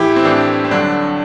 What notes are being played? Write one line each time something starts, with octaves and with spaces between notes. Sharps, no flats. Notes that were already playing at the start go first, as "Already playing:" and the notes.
Already playing: A2 E3 E4 G4
C4
A2 E3 D4
C4
G2 D3 F#3 D4